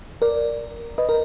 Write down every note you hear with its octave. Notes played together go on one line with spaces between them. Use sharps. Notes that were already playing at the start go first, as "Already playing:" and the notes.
A#4 D5
B4 D#5
A#4